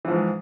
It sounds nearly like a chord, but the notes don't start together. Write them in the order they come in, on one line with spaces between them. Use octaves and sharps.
E3 F3 G#2